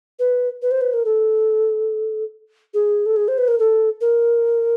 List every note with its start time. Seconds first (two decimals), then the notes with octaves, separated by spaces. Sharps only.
0.19 B4
0.62 B4
0.71 C5
0.81 B4
0.94 A#4
1.05 A4
2.74 G#4
3.06 A4
3.16 G#4
3.28 C5
3.38 B4
3.48 A#4
3.59 A4
4.01 A#4